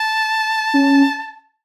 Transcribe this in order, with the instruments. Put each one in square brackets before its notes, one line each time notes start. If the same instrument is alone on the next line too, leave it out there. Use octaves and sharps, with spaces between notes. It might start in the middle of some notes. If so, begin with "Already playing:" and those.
Already playing: [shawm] A5
[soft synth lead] C#4